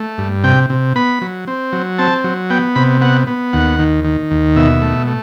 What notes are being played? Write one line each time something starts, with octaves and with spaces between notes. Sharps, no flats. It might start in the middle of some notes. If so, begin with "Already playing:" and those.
Already playing: A3
G2
C3 G5
C3
B3 B5
F#3
C4
F#3
C4 A5
F#3
B3 G5
C3 B5
B3 F#5
B3
D#2 F#5
D#3
D#3
D#2
B2 E5
A3
A3